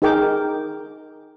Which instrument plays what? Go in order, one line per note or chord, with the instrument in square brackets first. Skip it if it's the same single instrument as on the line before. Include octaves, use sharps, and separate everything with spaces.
[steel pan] D#4 G#4 A#4 G5 D6